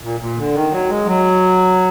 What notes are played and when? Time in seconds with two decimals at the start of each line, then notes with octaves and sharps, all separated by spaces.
0.03 A#2
0.20 A#2
0.38 D3
0.55 D#3
0.72 F#3
0.89 G#3
1.06 F#3